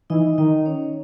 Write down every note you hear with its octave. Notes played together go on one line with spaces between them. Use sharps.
E3 D#4 D#5
D#3 D#4 D#5
C#4 C#5